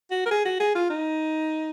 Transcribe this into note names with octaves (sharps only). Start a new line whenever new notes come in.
F#4
A#4
G#4
F#4
G#4
F4
D#4